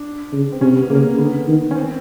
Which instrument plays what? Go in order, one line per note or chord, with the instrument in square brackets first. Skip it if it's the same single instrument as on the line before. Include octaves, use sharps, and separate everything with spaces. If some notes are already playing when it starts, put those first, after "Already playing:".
Already playing: [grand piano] D4
[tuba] C#3
[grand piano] C4
[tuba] C3 [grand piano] C#4
[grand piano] B3
[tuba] C#3 [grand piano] A#3
[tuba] D3 [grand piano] B3
[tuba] D#3
[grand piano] C#4
C4